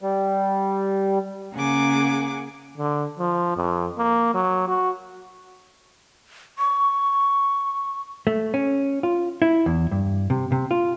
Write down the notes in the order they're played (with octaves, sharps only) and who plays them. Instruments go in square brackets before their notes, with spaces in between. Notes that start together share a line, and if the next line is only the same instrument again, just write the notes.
[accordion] G3
[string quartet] C#3 A#3 G#4 F#5 G#5 D6
[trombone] D3
F3
F2
A#3
F#3
F#4
[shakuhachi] C#6
[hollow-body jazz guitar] A3
C#4
F4
E4
E2
G2
C3
C3
F4